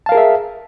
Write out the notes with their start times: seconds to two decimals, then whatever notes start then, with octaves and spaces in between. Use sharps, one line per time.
0.06 A5
0.09 F5
0.12 A#4
0.15 G#4
0.18 E5